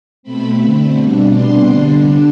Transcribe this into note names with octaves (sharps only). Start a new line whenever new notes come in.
B2 A3 C4 B5
D3 A3 C4
B2 G3 D4
C3 G3 B3 D4 C6
D3 G3 D4